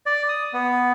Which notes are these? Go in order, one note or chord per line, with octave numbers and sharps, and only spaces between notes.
D5
D#6
B3